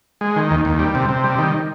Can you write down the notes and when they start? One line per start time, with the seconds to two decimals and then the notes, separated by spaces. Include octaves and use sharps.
0.21 G#3
0.36 D#3
0.51 D#2
0.65 D#2
0.79 G3
0.95 C3
1.09 C3
1.24 G3
1.38 D#3